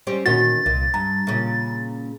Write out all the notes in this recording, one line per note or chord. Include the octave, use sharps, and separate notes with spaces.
G3 C4 C#4
D2 A#2 D#3 C#4 F#4 A6
C2 A#2
G2 A#5
A#2 C#3